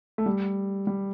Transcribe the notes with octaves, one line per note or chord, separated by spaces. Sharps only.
A3
G3
G3